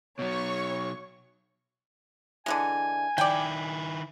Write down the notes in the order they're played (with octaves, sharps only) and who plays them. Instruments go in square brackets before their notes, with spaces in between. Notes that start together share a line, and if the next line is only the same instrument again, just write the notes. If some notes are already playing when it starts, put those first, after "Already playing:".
[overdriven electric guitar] B2 F#3 [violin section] C#5 C#6
[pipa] D3 E3 G#3 [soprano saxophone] G#5
[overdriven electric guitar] D#3 E4 [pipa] D5 G5